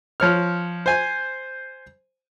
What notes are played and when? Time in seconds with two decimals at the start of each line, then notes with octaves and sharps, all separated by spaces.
0.20 F3 C#5 F6
0.86 C5 G#5